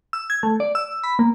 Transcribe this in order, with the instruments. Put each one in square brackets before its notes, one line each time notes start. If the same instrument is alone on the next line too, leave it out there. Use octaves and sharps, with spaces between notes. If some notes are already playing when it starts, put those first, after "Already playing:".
[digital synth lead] E6
G#6
A3
D5
E6
B5
A#3